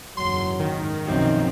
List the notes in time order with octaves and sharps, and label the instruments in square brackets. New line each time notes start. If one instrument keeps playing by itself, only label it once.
[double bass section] F#1 E2 G#2 [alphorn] F#3 [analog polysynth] C6
[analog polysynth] D#3
[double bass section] B1 B2 F3 [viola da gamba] F#2 C4 [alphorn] D#4